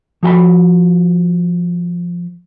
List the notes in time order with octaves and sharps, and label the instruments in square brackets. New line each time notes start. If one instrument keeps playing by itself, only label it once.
[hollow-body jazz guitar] F3 F#4 G5 B5